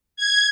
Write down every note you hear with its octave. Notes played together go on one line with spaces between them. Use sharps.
G#6